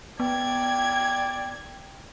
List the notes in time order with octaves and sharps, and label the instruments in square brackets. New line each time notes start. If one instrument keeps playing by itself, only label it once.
[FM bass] B3 [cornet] D5 [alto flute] G5 [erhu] G#6